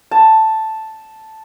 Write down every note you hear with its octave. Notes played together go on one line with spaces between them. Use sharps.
A5